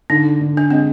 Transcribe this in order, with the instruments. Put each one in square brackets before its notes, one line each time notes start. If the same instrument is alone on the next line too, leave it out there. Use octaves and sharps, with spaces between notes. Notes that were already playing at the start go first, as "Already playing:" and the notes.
[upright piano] D3 [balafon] D#4
[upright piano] D3
[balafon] D4
[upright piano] G#3 [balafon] C4